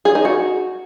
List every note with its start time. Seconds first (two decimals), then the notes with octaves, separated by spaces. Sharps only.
0.05 G#4
0.15 D#4
0.25 F#4